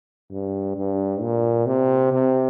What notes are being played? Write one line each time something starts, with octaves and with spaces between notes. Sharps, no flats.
G2
G2
A#2
C3
C3